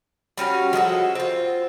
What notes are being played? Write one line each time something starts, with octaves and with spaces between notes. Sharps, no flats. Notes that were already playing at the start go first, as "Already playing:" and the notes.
G3 C#4 F#4 F5
F3 G#3 F#4 A4
C4 F4